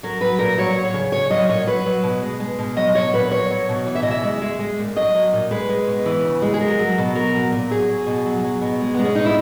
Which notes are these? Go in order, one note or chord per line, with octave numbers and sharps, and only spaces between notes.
F#3 A#4
F#3 B4
A#2 A#4
F#3 C#5
F#3
C#5
C#3
F#3 C#5
F#3 D#5
A#2 C#5
F#3 B4
F#3
B2
G#3
G#3
B2
F#3 D#5
F#3 C#5
A#2 B4
F#3 C#5
F#3
B2
E3
E5
D#5
C#3
E5
G#3
G#3
G#3
A#2
F#3 D#5
F#3
A#2
G#3 B4
G#3
B2
E3
C#3
G#3
G#4
F#3 A#4
F#3
B2
F#3 A#4
F#3
A#2
F#3 G#4
F#3
B2
F#3
F#3
B2
G#3
G#3 B3
C#4
B2 D#4
E4